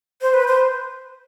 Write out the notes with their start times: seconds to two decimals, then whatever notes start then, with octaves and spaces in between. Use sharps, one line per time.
0.22 C5
0.34 B4
0.48 C5